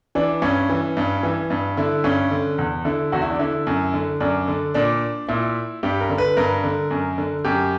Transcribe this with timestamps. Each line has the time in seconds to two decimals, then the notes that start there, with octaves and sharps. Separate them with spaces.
0.15 E3 D4
0.42 G2 C#4
0.69 E3
0.97 G2
1.23 E3
1.50 G2
1.77 D3 E4
2.04 G2 C#4
2.31 D3
2.58 E2
2.85 D3 E4
3.12 E2 F#4
3.22 E4
3.30 D4
3.39 D3 E4
3.67 F#2
3.94 D3
4.20 F#2 D4
4.48 D3
4.74 A#2 D4
5.28 A#2 E4
5.83 G2 G4
6.01 A#4
6.10 D3
6.18 B4
6.37 G2 A#4
6.64 D3
6.91 F#2
7.18 D3
7.45 F#2 G4